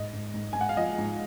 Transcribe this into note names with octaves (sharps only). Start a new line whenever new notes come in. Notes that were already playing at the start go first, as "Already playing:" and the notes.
Already playing: G#2 D#5
G#2
G#2
G#2 G#5
F#5
F5
F3 D#5
G#2